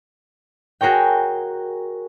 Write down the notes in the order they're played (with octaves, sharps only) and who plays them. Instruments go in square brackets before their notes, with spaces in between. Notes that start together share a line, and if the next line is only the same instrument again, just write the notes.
[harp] F#4 G#4 A#4 C#5 G5